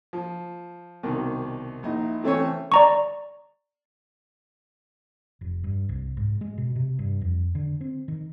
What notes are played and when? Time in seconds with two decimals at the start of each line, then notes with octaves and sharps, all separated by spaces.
0.13 F3
1.03 C2 B2 D#3
1.83 A#1 D#4 E4
2.24 E3 A3 C4 C#4 C5 C#5
2.72 D5 A#5 C#6
5.41 F1
5.64 G2
5.89 C2
6.17 G#2
6.41 G#3
6.58 B2
6.76 C3
6.99 G2
7.21 F2
7.55 D3
7.81 C4
8.08 D#3